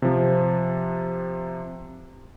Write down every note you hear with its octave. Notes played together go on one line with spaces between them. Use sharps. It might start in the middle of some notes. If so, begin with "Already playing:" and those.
C3 F3